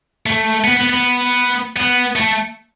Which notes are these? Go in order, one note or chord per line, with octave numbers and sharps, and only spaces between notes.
A3
B3
B3
B3
B3
A3